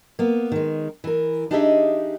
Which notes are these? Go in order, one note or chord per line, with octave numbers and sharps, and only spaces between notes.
A#3 B3
D#3 G#3
E3 A#4
D4 D#4 G4 G#4 D#5 E5